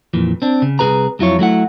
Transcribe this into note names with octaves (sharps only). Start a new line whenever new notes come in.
F2 A#2 E3
C4 D4
C#3
C2 C3 G#4 B4 A#5
F2 F#3 E4 F4 C#5
F#3 A3 E4 F#5